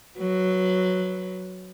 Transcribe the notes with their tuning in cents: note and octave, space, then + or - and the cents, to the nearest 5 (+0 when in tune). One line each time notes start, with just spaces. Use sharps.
F#3 +0 B4 +0